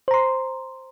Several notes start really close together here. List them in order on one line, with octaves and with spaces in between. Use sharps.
C5 A#5 C6